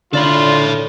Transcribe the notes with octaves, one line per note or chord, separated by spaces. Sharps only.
D3 F4 A4 C#5 D5 B5